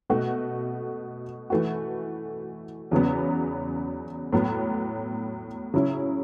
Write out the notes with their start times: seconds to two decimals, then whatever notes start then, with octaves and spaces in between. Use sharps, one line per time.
0.10 B2 A3 F#4
1.50 E3 A3 F#4
2.91 E2 C#3 F#3 B3
4.33 A2 F#3 B3
5.74 C#3 F#3 C#4 E4